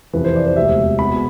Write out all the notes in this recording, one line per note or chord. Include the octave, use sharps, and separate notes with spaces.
F2 C3 E3 B4
C5
D5
C5
E1 D2 C3 E5
E2 B2 B3 B5